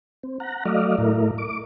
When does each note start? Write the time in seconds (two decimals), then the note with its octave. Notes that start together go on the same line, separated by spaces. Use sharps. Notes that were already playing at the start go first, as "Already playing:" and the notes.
0.23 C4
0.40 F#5 A#5
0.65 F#3 A3 D5 D#5 F5
0.98 A2 A3 E4 A#4
1.38 D6